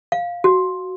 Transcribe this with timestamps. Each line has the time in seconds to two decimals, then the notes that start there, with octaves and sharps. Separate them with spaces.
0.12 F5
0.44 F#4